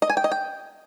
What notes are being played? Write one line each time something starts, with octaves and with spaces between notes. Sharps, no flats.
D#5
G#5
G5
D#5
G5